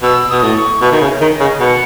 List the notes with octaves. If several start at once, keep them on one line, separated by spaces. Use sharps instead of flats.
B2 E6
B2 D#6
A2
C#6
B2 E5
D#3
C#3
C#5
D#3
D#5
C#3
B2 F#5